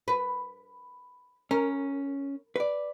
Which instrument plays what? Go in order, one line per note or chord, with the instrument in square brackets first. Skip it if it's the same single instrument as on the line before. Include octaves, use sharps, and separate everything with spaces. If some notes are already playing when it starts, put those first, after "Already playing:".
[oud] B4
[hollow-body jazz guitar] C#4 [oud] A#4
[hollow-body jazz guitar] B4 D5